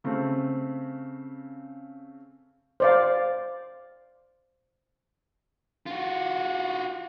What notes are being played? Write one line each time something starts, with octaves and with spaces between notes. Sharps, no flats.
C#3 A3 C4
C5 D5 F5
F4 F#4